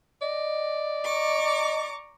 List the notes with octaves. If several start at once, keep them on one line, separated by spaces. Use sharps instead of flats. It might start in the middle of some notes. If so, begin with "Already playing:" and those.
D5 D#5
A#5 C#6 D6